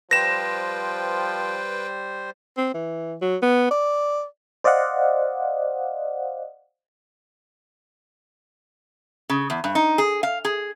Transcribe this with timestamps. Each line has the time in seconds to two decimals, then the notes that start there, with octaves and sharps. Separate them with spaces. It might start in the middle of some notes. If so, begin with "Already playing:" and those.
0.11 F3 G3 B4 C5 G5 A#6 E7
2.57 C4
2.74 E3
3.22 F#3
3.42 B3
3.71 D5
4.64 C5 D5 D#5 F5 F#5
9.29 C#3
9.50 E2
9.64 G2
9.75 D#4
9.98 G#4
10.23 F5
10.45 G#4